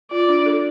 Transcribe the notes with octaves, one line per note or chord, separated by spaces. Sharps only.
F4 D5
D4
A4